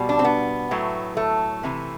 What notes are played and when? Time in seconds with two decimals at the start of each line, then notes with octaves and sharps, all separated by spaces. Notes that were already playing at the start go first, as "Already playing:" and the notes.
Already playing: B2 G3
0.09 D4
0.19 C4
0.24 B3
0.71 A2 F#3 A3
1.17 A3
1.63 C3 E3 A3